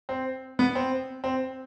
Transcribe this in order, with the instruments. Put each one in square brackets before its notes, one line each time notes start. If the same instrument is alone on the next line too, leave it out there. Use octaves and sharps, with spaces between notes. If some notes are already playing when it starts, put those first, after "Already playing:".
[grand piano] C4
B3
C4
C4